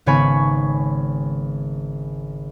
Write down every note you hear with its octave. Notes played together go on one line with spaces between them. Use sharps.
G#1 C#3 B3 C#5 G#5 B5